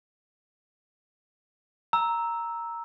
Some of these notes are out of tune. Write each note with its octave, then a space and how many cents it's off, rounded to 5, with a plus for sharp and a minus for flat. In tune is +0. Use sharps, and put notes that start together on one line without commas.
A#5 +0 E6 -10